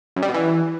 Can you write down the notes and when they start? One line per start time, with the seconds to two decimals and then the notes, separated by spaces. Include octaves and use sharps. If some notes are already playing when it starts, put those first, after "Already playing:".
0.16 F#2
0.22 G3
0.28 B2
0.34 E3